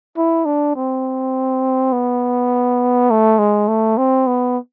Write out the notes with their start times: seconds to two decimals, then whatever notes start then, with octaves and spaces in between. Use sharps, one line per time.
0.17 E4
0.46 D4
0.76 C4
1.93 B3
3.10 A3
3.39 G#3
3.68 A3
3.98 C4
4.27 B3